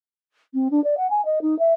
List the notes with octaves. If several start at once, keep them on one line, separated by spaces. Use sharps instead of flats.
C4
D4
D5
F#5
G#5
D#5
D#4
E5